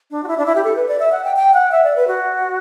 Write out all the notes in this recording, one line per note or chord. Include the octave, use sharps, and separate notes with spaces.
D4
F#4
E4
D4
E4
G4
A4
B4
D5
E5
F#5
G5
G5
F#5
E5
D5
B4
F#4